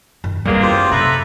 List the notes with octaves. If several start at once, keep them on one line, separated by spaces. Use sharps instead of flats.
F#2 D#3
D#1 E2 G2 G3 G#3 A#3 C4
F#2 F4 G4 C5
C3 A4 B4 E5 A#5